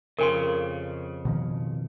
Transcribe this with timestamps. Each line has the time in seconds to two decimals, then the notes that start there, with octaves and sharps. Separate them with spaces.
0.19 F2 C#3 A#4 G#5 C6
1.25 B2 D#3 F3